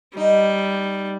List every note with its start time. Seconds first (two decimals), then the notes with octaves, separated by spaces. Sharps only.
0.17 G3 D#4